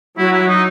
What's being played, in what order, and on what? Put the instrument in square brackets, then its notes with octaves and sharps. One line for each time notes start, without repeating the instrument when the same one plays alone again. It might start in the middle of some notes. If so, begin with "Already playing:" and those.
[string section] F#3 [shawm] E4
[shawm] E4
D#4